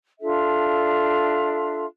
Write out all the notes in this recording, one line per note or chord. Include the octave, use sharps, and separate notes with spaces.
D4 F4 A4 E5